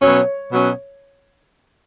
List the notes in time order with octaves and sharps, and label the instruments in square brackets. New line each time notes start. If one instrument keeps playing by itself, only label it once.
[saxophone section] B2 F#3 C#4 [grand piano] C#5
[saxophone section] B2 F#3 C#4